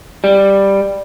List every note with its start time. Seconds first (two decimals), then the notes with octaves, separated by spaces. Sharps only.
0.24 G3